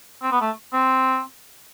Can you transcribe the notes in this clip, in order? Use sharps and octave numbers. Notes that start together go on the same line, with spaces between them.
C4
B3
A3
C4